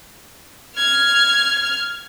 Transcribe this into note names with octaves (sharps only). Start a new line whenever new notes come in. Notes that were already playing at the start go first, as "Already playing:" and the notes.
F6 G#6